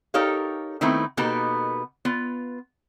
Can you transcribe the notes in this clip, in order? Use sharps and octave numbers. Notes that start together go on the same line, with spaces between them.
D#4 G4 A4 A#4 C#5 F5
D#3 A3 B3 C4 D#4 E4
B2 A#3 B3 D#4 G4 A4
B3 F4